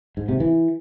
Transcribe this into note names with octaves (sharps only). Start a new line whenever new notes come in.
G#2
C3
E3